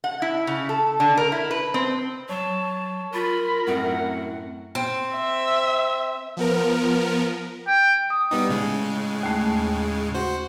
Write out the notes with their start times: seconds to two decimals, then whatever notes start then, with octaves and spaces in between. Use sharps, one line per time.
0.04 F#5
0.22 E4
0.47 C#3
0.69 A4
1.00 D3
1.17 A#4
1.32 E4
1.51 B4
1.74 C4
2.29 F#3 C#5 A5
3.14 F4 A#4 B5
3.67 F#2 A2 C4 F#5
4.75 C4
5.15 E5
6.37 F3 B3 A#4
7.67 G5
8.10 D#6
8.31 G3 B3 D#4
8.49 A2 C#3 G#3
9.23 D#2 A3
10.14 F#4 C5